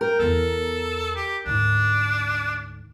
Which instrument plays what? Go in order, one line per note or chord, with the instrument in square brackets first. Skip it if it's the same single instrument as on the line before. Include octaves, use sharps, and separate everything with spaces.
[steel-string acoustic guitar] A#4 [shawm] G5
[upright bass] E2 B3 [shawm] A4
[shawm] G4
[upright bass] D2 G#2 [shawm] D4